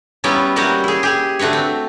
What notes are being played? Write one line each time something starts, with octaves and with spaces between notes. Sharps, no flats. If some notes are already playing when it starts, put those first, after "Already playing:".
F#3 G3 B3 C#4 E4 F4
F#3 G3 A#3 E4 F#4 G4
E4 G#4
G4 G#4 G#5
D3 A3 F#4 B4 C#5
C4